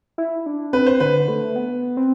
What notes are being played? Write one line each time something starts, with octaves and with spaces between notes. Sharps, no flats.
E4
D4
C4 B4
C5
D3 B4
A3
B3
C4